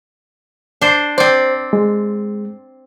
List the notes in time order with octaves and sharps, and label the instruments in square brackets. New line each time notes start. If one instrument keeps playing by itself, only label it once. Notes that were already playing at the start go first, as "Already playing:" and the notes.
[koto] D4 C5
[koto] C4 D5 [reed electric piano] C5
[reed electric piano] G#3